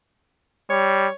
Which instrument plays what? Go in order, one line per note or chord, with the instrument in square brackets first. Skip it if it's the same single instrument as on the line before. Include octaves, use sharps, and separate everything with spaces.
[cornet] G3 [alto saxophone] C#5